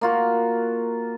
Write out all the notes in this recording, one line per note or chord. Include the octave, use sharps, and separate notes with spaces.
A#3 F4 F#4